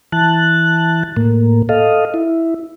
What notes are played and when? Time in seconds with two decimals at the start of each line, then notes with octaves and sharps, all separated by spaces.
0.12 E3 A5 F#6
1.17 A2 A#3
1.69 A4 D#5 F5
2.14 E4